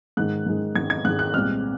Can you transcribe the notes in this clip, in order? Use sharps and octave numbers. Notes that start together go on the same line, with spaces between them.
G#2 D#3 G#3 F#6
G#2 D#3 G#3
G#2 D#3 G#3 G#6
G#6
G#2 D#3 G#3 F#6
F#6
C2 A#2 G#3 C4 F6